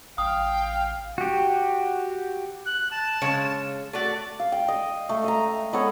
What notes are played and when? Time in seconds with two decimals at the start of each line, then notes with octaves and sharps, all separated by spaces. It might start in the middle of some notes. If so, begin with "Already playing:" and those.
0.18 A1 F5 G5 D#6
1.18 F#4 G4
2.65 F#6
2.91 A5
3.21 C#3 G#3 C#5
3.93 A3 F#4 D5
4.39 F5
4.52 G5
4.68 D#5
5.09 A3
5.24 D#5 A#5
5.73 G#3 B3 A4 C#5